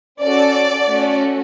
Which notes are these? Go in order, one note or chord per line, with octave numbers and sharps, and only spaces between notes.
C#4 F#4 A4 D5
A3 C#4 F#4